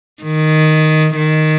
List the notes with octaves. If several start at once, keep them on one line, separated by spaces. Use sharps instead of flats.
D#3
D#3